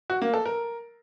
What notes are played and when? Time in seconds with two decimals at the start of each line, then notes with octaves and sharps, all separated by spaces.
0.10 F#4
0.22 A#3
0.34 A4
0.45 A#4